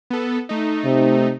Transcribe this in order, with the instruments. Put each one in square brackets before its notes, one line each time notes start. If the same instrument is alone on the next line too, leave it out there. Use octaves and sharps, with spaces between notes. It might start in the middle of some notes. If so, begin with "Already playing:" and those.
[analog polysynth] B3 A4
A3 D#4
[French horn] C3